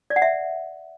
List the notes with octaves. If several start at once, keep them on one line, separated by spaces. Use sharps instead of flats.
D5
F#5
E5